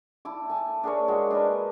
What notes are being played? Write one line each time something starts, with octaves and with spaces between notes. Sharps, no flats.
E4 A5 D6
G#5 A5
D4 G#4 A#4 C#5
G#3 F#4
D4 A#4 B4